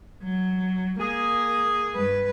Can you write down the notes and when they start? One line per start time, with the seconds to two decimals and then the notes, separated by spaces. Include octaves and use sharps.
0.23 F#3
1.00 A#3 G#4
1.95 G2 B4